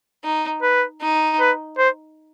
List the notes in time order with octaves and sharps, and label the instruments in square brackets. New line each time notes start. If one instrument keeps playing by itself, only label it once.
[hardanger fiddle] D#4
[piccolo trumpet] B4
[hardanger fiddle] D#4
[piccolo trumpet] B4
C5